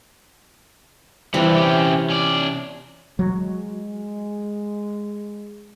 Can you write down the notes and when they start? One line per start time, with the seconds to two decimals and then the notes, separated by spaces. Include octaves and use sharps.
1.34 C3 E3 G3 D4
1.56 C#4 G4
2.10 C#4 D5
3.19 F#3 G#3